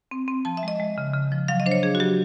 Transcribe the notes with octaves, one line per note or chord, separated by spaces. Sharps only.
C4
C4
F3 A5
E5
G#3 D#5
G#3
C#3
C#3
F3
F#3 F5
D#5
D4 C5
C#5
D4 G#4
F#4
F#3 G4